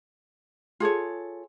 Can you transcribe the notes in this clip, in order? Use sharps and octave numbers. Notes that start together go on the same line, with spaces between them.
F4 G#4 A4 C#5